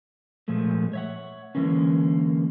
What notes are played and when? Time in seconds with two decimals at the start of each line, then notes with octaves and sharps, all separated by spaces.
0.48 A#2 F3 G#3 A3
0.93 C#5 E5 F#5
1.55 D3 E3 G#3 A#3 C#4